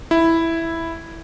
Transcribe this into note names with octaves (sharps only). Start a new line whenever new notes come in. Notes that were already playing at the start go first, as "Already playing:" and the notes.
E4